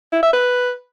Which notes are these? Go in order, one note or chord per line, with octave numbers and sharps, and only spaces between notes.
E4
E5
B4